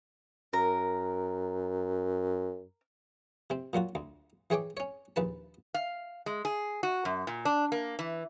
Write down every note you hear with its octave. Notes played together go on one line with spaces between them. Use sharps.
F#2 A#4
C3 C4
A#2 F#3 F4 F#4
D2
E3 G#4 C#5 G5 D6
C#4 C#5
A#1 D#2 B4 A5
F5
G#3
G#4
F#4
F#2
A#2
D4
A#3
E3